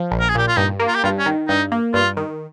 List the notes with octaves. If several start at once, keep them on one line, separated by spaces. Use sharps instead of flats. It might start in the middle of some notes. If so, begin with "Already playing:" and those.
Already playing: F3
A#1
A#4
G#4
A#2 G4
F4
G2 D#4
A#3
F4
G4
G2 F4
C#4
D#3
G2 D#4
A#3
G2 F4
D#3